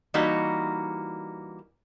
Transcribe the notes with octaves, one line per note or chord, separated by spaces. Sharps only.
E3 G3 A#3 D#4 F#4